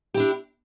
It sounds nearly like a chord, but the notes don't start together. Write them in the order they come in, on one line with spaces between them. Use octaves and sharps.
G4 E4 D4